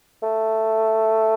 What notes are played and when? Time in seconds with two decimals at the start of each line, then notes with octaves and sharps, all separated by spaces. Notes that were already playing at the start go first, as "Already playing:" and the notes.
0.23 A3